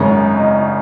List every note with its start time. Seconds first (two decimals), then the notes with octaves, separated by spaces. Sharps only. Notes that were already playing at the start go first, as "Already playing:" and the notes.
Already playing: G#1 F#2 C#3 G#3 C#5
0.37 D#5